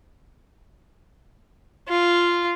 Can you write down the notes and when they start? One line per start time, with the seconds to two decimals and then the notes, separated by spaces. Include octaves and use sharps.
1.88 F4